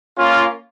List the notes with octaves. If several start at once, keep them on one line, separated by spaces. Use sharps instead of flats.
A#3 C#4 F4